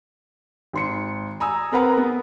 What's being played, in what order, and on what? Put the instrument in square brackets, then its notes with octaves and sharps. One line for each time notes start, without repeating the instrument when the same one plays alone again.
[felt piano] G#1 C6 C#7
G#5 A#5 D#6 E6
C4 A#4 B4 F#5 A#5
B3